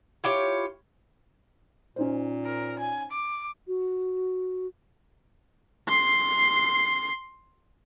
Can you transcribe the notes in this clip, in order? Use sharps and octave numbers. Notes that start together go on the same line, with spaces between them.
E4 F4 G4 C#5
A#2 C#4 D#4 C5
A#4
G#5
D6
F#4
C6 C7